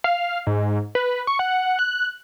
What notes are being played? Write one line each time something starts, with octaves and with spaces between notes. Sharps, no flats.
F5
G#2
B4
C#6
F#5
F#6